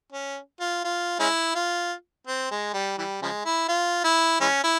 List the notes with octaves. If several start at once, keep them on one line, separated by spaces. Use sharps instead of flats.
C#4
F4
F4
G#3 C#4 E4
F4
C4
G#3
G3
E3 G3
C#3 F3 G#3
E4
F4
E4
E3 G#3 C#4
E4